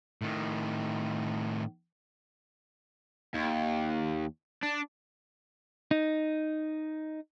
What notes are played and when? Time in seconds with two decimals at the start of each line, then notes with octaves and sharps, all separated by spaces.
0.22 A2 D#3
3.34 D#2
4.63 D4
5.91 D#4